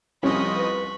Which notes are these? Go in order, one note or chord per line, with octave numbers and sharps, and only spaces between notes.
C2 F3 C#4 D#5 B5 C#6
B4